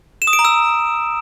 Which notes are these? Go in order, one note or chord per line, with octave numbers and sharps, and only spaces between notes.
E7
D#6
D7
A#5
E6